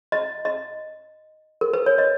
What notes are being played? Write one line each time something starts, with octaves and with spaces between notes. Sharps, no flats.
D#5
D#5
A#4
B4
C#5
D#5